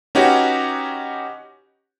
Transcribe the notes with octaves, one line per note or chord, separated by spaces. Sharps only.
C#4 D#4 F#4 G4 B4 C#5